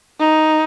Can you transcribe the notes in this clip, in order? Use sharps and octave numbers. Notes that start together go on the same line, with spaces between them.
D#4